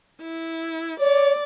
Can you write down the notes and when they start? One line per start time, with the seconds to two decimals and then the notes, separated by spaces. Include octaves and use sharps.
0.21 E4
1.00 C#5 D5